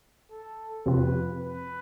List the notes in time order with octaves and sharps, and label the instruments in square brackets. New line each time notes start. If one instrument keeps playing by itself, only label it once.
[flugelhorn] A4
[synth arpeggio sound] F2 C3 F3 C4 F4 [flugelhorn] B4
[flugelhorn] B4